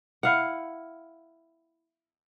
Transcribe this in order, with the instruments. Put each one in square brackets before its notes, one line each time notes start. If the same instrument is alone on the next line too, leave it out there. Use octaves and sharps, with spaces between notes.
[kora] E4 F5 F#5